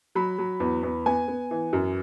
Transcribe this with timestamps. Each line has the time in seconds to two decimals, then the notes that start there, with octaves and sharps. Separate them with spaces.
0.15 F#3 B5
0.38 F#3
0.60 E2
0.83 E2
1.06 B3 G#5
1.28 B3
1.51 E3
1.73 F#2